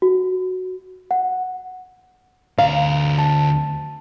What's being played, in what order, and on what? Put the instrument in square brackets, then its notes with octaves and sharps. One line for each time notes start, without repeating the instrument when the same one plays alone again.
[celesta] F#4
F#5
[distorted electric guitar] D2 A#5 [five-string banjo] F5
[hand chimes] A5